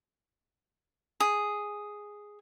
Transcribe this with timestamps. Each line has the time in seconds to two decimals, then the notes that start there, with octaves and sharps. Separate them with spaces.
1.20 G#4